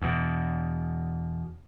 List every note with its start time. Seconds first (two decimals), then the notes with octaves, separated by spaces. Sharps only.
0.02 E2 B2